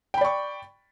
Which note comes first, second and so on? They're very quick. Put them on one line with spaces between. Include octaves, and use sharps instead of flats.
G5 B5 D5 C#6